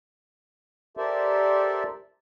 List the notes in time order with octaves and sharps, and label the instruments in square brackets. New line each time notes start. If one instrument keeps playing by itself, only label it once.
[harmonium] G4 A4 A#4 C5 D5 E5